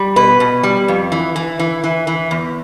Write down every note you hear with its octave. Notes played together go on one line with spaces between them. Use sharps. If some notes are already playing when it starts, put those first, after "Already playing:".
Already playing: G3
B2 B4
B2
G3
F2
E3
E3
E3
E3
E3
E2